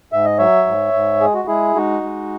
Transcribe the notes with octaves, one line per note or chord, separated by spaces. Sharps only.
G#2 E5
D#5
F#3 C#5 E5
G#2
G#2
G#3 G#4
F#4
G#3 E4 G#4
G#3 D#4 F#4
G#3